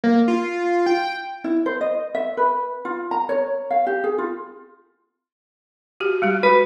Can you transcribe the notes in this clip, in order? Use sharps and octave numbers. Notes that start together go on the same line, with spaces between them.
A#3
F4
G5
E4
C5
D#5
E5
B4
F4
A#5
C#5
F5
G4
G#4
F4
F#4 G4
G3 G#3 G4
F#4 B4